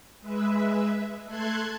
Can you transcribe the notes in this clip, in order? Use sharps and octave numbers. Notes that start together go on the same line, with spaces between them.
G#3 B4 E5
A3 A4 C6 F#6 G#6